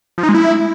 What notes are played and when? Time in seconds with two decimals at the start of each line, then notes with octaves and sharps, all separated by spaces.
0.18 F3
0.23 D#4
0.29 G#3
0.35 E4